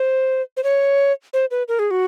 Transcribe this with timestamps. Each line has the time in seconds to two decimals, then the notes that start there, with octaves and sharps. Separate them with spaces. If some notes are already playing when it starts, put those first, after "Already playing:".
Already playing: C5
0.57 C5
0.64 C#5
1.33 C5
1.51 B4
1.68 A#4
1.79 G#4
1.91 F#4